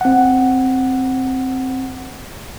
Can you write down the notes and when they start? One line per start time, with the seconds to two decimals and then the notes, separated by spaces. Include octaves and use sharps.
0.01 C4 F#5